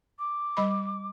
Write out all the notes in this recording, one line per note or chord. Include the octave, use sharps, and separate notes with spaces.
D6
G3 D#5 B5